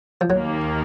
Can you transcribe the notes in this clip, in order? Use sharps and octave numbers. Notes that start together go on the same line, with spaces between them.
F3
D#2 D#3 F#3 A#3